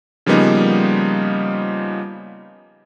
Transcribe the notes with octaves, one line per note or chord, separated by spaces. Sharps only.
C#3 F3 G3 A#3 B3 D#4